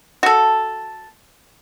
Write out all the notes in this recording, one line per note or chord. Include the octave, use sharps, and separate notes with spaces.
F#4 A4